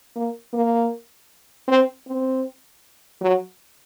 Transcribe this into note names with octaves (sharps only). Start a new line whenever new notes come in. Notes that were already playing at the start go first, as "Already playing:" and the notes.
A#3
A#3
C4
C4
F#3